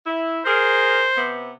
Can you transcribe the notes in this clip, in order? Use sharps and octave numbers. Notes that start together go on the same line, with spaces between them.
E4
G#4 A#4 C5
C3 B3